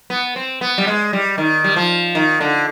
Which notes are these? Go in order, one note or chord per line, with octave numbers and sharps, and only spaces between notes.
B3
C4
B3
G3
G#3
G3
D#3
G3
F3
D#3
D3